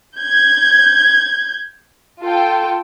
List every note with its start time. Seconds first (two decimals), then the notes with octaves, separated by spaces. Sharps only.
0.17 G6 G#6
2.23 F4 A4 G5